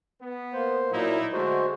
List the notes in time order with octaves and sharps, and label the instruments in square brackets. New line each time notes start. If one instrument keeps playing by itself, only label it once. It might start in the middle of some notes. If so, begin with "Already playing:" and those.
[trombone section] B3
[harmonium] A#3 C5
[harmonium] A#2 F#3 [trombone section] A#3 D#4 E4
[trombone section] D3 A3 [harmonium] G#3 F#4 C5